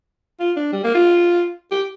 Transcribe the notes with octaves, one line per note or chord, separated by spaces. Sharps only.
F4
D4
G3
A#3
F4
G4